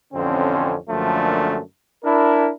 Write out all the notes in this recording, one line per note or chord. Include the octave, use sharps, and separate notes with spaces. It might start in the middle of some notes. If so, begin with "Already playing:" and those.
A1 F2 D3 C4 C#4
F#2 D3 F3 A3 A#3 D4
D4 E4 A#4